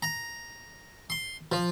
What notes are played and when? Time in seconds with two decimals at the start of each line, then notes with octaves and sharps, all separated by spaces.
0.03 A#5
1.10 C6
1.52 F3